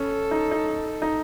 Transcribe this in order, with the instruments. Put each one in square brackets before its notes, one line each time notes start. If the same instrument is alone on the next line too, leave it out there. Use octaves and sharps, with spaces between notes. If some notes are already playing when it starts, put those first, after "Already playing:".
Already playing: [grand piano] C#4 [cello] A4
[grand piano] D#4
D#4
D#4